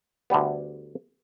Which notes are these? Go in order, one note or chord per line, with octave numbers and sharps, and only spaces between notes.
D2 D3 G3 B3